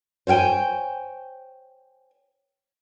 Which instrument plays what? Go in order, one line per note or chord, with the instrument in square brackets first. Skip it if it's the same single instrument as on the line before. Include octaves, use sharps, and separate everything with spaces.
[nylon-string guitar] C5 C#5 F5 G5 G#5